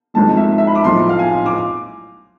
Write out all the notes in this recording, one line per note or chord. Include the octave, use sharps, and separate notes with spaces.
G#1 G#2 F3 A3 A5
E5
E5
B5
D6
B1 A2 F3 A3 C6
F5
G#5
D6